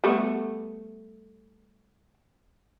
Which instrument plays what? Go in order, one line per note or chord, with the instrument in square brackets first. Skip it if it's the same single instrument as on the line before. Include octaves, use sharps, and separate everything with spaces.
[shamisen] G3 A3 B3